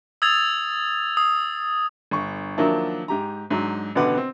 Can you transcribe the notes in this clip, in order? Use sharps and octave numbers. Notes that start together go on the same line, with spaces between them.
D#6 E6 G#6 A6 F7
D#6
G1 C#6
D#3 F3 F#3 A#3 D4 E4
G#2 G4 A#5
G#2 F#3 D4
A1 B2 D3 B4 F#5 D6
C4